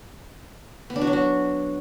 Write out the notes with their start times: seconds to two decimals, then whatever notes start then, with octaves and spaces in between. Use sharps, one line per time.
0.90 B3
0.96 D4
1.02 F#4
1.07 F#3
1.13 F#4